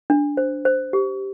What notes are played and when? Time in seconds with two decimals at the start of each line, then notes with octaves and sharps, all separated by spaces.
0.10 D4
0.37 C5
0.65 C5
0.93 G4